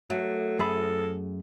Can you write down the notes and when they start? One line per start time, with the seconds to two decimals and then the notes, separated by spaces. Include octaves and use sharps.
0.10 F#3 A3
0.59 F#2 G#4 A4 B5